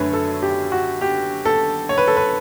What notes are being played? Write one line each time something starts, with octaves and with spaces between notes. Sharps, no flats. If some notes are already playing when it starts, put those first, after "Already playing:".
Already playing: F#2 D3 A3 B4 C#5
A4
G4
F#4
G4
A4
C#5
B4
A4
B4